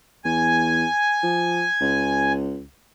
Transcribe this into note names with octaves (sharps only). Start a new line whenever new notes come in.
E2 G#5
F3
C#2